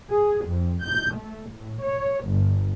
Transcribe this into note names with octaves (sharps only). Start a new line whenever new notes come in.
G#4
F2
G6
A3
A2
C#5
G1